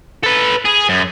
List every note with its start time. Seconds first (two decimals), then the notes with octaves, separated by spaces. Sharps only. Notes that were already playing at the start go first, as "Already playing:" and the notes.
0.24 A4 B4
0.65 G#4
0.89 F#2